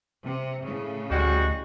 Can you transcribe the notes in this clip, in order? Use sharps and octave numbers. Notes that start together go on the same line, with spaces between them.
C3
A2 C#3
D2 G3 G#3 F#4